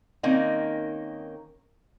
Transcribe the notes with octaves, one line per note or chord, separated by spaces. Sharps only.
D#3 A#3 C4 C#4 D#4